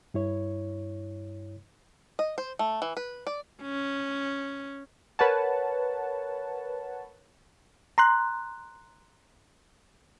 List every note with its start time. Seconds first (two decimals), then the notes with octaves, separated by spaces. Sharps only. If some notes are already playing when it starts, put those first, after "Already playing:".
0.14 G2 E4 C#5
2.19 D#5
2.38 C5
2.59 A3
2.82 E3
2.97 B4
3.27 D5
3.62 C#4
5.19 A#4 B4 C#5 F#5 A5
7.98 A#5 C6 F#6